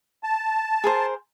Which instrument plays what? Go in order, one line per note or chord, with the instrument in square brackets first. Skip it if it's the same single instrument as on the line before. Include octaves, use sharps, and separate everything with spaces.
[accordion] A5
[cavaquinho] G#4 A#4 C5